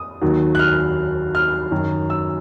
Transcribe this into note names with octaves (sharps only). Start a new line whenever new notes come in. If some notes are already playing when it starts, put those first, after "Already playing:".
Already playing: D#6
D#2 D#3 F#3
F#6
F6
F6
F#2 D#3 F#3
E6